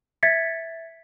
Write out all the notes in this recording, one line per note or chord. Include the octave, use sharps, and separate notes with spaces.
E5 G#6 A6 B6 C#7